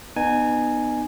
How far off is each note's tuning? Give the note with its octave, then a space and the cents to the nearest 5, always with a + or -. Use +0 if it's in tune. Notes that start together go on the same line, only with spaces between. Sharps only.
B3 +0 D#4 -35 G#5 +0